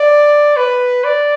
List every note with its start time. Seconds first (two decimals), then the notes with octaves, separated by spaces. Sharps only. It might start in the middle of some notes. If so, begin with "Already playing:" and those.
Already playing: D5
0.57 B4
1.04 D5